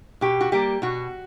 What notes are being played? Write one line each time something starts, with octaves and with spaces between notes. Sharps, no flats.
B2 G4
F#4
G3 A#3 G4
B2 F#4